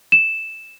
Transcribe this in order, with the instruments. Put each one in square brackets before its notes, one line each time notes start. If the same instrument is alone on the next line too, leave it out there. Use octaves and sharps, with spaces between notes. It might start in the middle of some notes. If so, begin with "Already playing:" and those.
[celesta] E7